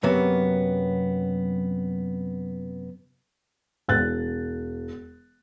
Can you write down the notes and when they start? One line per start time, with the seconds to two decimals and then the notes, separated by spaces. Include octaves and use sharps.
0.03 F#2 C3 F#3 A#3 B3 E5
3.88 E1 F#6 A6